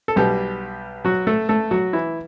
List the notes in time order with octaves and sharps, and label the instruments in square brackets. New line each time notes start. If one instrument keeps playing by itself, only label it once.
[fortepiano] A4
B1 B2 G3 G4
F#3 F#4
A3 A4
A3 A4
F#3 F#4
E3 E4